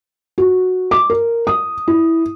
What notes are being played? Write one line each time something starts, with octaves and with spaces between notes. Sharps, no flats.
F#4
D6
A#4
D#6
E4